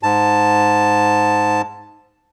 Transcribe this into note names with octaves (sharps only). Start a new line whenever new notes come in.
G#2 A5